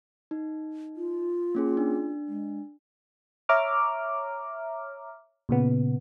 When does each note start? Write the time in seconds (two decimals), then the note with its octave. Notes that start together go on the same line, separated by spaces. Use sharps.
0.31 D#4
0.97 F4
1.55 A#3 C#4 G#4
1.77 D4
2.28 G#3
3.49 C#5 E5 A#5 D6 F6
5.49 A#2 C#3 B3